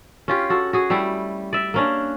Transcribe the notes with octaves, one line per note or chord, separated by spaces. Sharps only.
C#4 F4 G4
F#4 A4
F#4 G#4
G3 A3 E4 G4
D5 E5
A#3 C#4 D4